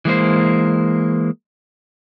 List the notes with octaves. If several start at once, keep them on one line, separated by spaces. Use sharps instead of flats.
E3 G#3 A#3 C5